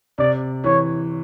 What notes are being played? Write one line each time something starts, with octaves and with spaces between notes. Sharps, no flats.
C3 D5
E3 C#5